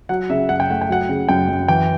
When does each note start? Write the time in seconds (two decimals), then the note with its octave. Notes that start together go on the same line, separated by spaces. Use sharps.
0.09 F#3 F#5
0.30 C#3 E5
0.49 F#2 F#5
0.60 G5
0.70 A3 F#5
0.81 G5
0.89 F#3 F#5
1.09 C#3
1.29 F#2 G5
1.49 F#2
1.68 E3 G5